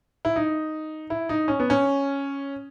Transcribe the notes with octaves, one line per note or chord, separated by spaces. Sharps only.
E4
D#4
E4
D#4
C#4
B3
C#4